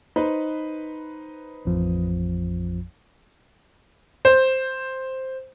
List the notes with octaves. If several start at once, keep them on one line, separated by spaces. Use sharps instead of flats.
D#4 B4 C5
A1 F2 F3
C5